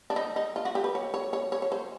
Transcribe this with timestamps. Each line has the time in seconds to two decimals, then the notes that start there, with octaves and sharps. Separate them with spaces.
0.10 D4
0.16 D#4
0.36 D#4
0.56 F4
0.65 F#4
0.75 G4
0.84 B4
0.95 C#5
1.14 C#5
1.33 C#5
1.52 C#5
1.62 C#5
1.72 C5